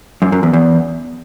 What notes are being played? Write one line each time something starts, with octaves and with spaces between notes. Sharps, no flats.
F#2
F#2
E2
E2